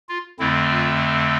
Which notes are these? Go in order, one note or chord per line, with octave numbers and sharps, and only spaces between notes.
F4
F2 D3 A3 C4 E4
F4